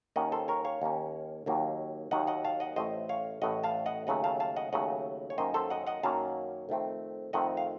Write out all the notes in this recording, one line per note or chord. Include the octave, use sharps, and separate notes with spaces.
D#2 D#3 A#3 C#4 D#5 F#5
A4 C5
A#4 C#5
C#5 F5
D#2 D#3 A#3 C#4
D#2 D#3 F#3 A#3
D#2 D#3 F#3 A#3 D#5 F#5
D#5 F#5
F5 A5
D#5 F#5
A1 A2 A3 C5 D#5
C#5 F5
A1 A2 A3 D#5 F#5
F5 A5
D#5 F#5
D#2 C#3 F#3 A3 D#5 F#5
F5 A5
F5 A5
D#5 F#5
D#2 C#3 F#3 A3 D#5 F#5
C#5
F#2 D#3 F#3 A#3 C#4 C5 D#5
A4 C5
D#5 F#5
D#5 F#5
F#2 D#3 F#3 A#3 C#4 F5 A5
F2 D#3 A3 C4
F2 D#3 A3 C4 D#5 F#5
F5